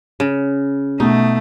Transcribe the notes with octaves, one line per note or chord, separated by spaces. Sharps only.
C#3
B2 A3 D#4